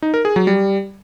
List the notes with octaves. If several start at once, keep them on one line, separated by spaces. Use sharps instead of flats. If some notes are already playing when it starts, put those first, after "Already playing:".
D#4
A#4
G#4
F#3
G3